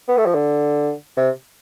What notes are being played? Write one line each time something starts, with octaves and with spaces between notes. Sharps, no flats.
B3
A3
F3
D3
C3